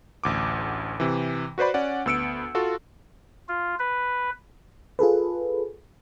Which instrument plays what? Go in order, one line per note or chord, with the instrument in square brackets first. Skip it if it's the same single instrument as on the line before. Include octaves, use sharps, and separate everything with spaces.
[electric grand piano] A1 D2 D6
C3 E3
F#4 B4 C5 D5 B5
C#4 D5 F#5
D2 B3 E6 C#7 D7
F4 F#4 A4
[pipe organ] F4
B4
[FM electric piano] F4 G#4 A4 B4